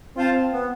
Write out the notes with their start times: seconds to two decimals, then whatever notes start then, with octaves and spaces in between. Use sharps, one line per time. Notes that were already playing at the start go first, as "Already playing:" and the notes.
0.16 C4 F4 C5 F5 A5
0.53 B3